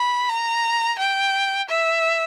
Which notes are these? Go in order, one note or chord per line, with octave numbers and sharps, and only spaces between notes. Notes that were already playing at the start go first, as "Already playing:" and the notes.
Already playing: B5
A#5
G5
E5